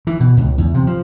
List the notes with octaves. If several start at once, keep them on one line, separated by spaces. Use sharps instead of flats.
E3
B2
C#2
E2
C3
F3